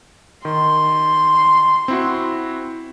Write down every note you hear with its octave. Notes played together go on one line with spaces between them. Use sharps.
D#3 C6
C4 E4 F#4